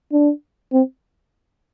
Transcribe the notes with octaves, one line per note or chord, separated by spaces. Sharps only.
D4
C4